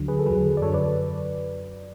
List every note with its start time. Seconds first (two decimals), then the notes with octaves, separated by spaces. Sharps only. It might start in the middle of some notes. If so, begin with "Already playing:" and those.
Already playing: D2 D3 F#3
0.08 G#4 B4
0.19 A4
0.26 E2 D3 F#3 G#4 B4
0.57 D5
0.62 F#2 D3 F#3 A4 C#5
0.73 B4 D5